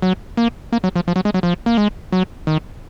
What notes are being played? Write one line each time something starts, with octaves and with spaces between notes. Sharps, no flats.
F#3
A#3
A#3
F#3
F3
F3
F#3
G#3
F#3
F3
A#3
G#3
F#3
D#3